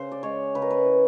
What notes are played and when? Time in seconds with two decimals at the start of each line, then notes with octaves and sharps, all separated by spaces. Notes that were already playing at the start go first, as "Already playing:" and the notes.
Already playing: C#3 C5
0.12 D5
0.23 G#3 C#5
0.55 C#3 B4
0.62 A#4
0.71 B4
0.85 E3